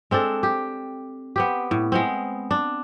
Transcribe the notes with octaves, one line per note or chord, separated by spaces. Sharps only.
G#3 C4 D4 A4
G4
B3 C4 G4
A2
G#3 B3 C4
D4